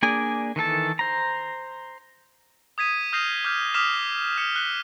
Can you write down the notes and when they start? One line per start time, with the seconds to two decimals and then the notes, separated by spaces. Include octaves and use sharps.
0.03 A#3 D4 G#4 D5 G#5
0.56 D#3 E3 A4 A5
0.99 C5 A#5
2.78 D#6 G#6 B6 D#7
3.13 D#6 F6 G6 A#6 C7 F7
3.45 D6 F6 G6
3.74 D6 D#6 F6 B6 E7 F7
4.38 F6 C#7 E7
4.56 F#6 B6